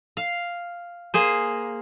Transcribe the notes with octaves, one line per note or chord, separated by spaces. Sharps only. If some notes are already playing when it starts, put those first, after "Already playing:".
F5
A#3 G#4 C5